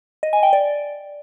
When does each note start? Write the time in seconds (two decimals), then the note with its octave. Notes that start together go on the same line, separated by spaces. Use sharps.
0.23 D#5
0.33 G#5
0.43 G5
0.53 D5